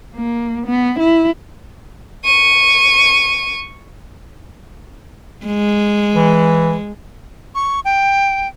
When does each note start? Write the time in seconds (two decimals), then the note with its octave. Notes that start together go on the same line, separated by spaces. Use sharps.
0.16 A#3
0.67 B3
0.99 E4
2.25 C#6 D#7
5.46 G#3
6.15 E3
7.55 C#6
7.85 G5